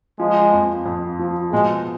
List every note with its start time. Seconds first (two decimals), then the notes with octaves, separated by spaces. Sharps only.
0.19 F3 G#3
0.53 F2
0.86 F2
1.19 F3
1.52 B2 G#3